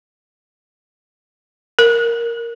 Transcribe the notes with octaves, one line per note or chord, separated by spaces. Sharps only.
A#4